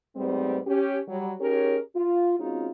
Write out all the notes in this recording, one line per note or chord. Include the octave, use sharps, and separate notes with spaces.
G#2 G3 A3 B3 C4
C#4 G4
F#3 G3
C#4 D#4 G4 G#4 A#4 C#5
F4
G#3 C4 C#4 D#4 F4 F#4